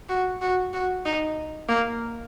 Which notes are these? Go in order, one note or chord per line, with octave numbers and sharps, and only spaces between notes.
F#4
F#4
F#4
D#4
A#3